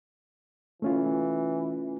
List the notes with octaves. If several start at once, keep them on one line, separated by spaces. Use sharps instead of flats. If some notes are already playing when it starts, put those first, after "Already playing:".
E3 A3 C#4 F4